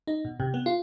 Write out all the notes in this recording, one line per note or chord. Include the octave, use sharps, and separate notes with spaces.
D#4
B2
C3
B3
F4